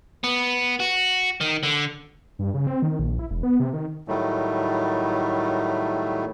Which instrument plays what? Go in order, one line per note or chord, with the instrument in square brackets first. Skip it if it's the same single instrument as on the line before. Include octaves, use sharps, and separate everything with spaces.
[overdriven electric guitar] B3
F#4
D#3
D3
[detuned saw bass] G2
C#3
C4
D#3
A#1
E4
E1
B3
C3
D#3
[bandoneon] A2 D#3 F#3 G3 A3